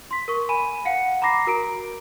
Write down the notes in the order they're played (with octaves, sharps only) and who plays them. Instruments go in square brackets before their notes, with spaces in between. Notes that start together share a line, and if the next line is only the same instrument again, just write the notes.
[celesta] C6 B6
A#4 C#6
G#5 B5 D#7
F5 F#5 C#7
A#5 B5 D6 A#6 C7
F#4 A#4 A#5 D7